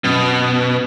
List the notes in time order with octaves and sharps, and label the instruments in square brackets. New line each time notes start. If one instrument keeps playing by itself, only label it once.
[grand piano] F#2 [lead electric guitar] B2